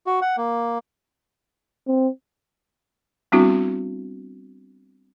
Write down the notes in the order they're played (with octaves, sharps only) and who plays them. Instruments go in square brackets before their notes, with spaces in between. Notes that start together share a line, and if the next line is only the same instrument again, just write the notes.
[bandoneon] F#4
F#5
A#3
[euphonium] C4
[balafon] G3 B3 C4 D4 E4 F#4